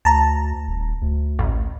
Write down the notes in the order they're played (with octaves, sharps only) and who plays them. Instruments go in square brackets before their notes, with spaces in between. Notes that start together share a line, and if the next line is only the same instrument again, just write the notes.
[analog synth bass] D2 [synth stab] A5 A#5
[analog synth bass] D#1
D2
[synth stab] A1